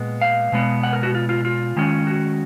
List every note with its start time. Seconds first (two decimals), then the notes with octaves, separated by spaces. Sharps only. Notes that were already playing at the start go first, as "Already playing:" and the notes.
Already playing: A#2 G#3 B3
0.21 F5
0.52 B2 G#3 B3
0.83 F#5
0.93 A#4
1.03 F#4
1.15 F4
1.29 F4
1.45 F4
1.76 D#3 G#3 C#4
2.07 F#4